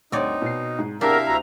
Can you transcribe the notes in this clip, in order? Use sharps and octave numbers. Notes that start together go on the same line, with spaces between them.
D2 G2 C4 D#4 C#5 D5
B2 C7
G#2
E2 C3 D4 E4 G4 A#4 E5 F5
D2 A#5